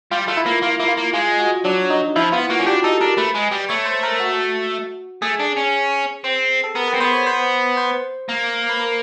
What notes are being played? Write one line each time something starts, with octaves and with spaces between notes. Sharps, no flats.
G3 F4
A3 F4
E4
A#3
A#3 F4
A#3 E4
F4
A#3
G#3 F4
F#4
F#3 D4
D#4
F3 E4
B3 F4
A#3 F#4
C#4
D4 G4
D#4 A4
D4 A#4
A3 B4
G#3
G3
A3 C#5
C5
A#4
F#4
A3 G#4
D4
C#4
C4
A4
B3 A#4
B4
C4
B3 C5
C#5
C5
C5
A#3
B4
A#4